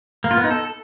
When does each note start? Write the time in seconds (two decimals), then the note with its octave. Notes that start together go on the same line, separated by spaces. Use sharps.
0.24 A#3
0.31 F4
0.37 B3
0.44 D#4
0.51 A4